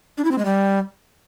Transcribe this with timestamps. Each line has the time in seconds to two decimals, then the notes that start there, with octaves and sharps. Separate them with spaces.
0.18 D4
0.25 E4
0.31 C4
0.38 G#3
0.45 G3